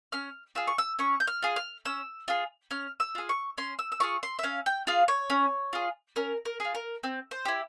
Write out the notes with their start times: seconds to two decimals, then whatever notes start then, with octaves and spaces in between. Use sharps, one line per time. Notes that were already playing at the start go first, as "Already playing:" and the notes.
0.12 C#4 F6
0.55 F4 G#4 E6
0.67 C#6
0.78 E6
0.99 C#4 C#6
1.20 G6
1.27 F6
1.42 F4 G#4
1.56 F6
1.85 C#4 E6
2.28 F4 G#4
2.71 C#4 F6
3.00 E6
3.15 F4 G#4
3.29 C#6
3.58 C#4 C6
3.79 E6
3.92 E6
4.00 F4 G#4 C#6
4.23 C6
4.39 E5
4.43 C#4 F5
4.66 G5
4.87 F4 G#4 F5
5.08 C#5
5.30 C#4
5.73 F4 G#4
6.16 C#4 A#4
6.45 A#4
6.60 F4 G#4
6.75 A#4
7.03 C4
7.31 C5
7.45 E4 G4